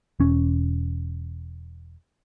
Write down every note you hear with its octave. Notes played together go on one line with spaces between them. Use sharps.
E1 C#4